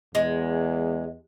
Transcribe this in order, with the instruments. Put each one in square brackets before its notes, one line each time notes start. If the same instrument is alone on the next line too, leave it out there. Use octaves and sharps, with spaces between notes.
[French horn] E2 [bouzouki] G#3